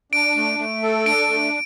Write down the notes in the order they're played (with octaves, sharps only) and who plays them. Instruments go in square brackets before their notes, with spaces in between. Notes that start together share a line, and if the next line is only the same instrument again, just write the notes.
[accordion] D4 [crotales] D7
[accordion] A3
A3
A4
[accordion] D4 [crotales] D7
[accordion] A3